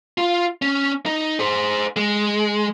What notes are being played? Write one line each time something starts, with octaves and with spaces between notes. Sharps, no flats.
F4
C#4
D#4
G#4 C5
G#3